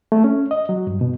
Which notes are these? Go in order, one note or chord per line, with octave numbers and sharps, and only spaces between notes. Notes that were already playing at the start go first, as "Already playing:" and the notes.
A3
C#4
D#5
F#3
G2
B2